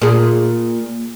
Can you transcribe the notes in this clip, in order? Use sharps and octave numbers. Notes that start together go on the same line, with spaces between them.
A#2 G#4